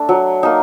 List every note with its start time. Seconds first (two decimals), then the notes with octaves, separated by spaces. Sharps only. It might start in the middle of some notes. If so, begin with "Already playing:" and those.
Already playing: A3 D4
0.09 F#3
0.43 A#3 D#4